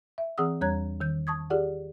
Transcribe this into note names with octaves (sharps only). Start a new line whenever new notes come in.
E5
E3 C4 G#4 F#5 D#6 E6
E2 G3 C#5 A#5 F#6 G#6
D#3 G6
A5 C#6 D#6 G#6
F4 G4 G#4 D5 F#5